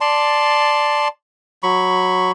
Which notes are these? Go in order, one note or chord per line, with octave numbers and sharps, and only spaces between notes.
D5 A5 C6
F#3 B5 C#6